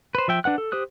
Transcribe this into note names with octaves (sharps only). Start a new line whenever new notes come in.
B4 C5
F3 E5 G5
D4 B4 F#5 F#6
A4
G4 C5 D#6 F#6